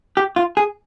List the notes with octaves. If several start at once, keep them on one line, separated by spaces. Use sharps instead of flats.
G4
F4
G#4